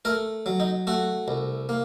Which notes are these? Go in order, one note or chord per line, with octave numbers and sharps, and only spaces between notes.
A3 A#4
F#3
D#4
A3 F#4
C2
A#3